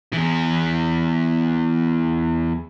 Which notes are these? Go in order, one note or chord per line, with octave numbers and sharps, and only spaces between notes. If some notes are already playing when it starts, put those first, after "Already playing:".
E2 E3